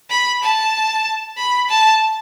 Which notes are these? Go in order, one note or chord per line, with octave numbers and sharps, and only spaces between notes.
B5
A5
B5
A5